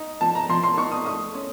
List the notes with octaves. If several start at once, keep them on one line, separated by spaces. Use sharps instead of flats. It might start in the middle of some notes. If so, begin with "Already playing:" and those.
Already playing: D#4
F3 A5
A#5
F3 C6
C6
D#4 C#6
D#6
A3 D#6
C#4